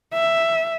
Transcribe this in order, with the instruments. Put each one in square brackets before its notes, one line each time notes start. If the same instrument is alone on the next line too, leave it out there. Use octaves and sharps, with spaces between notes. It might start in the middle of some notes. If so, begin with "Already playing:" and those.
[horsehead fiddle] E5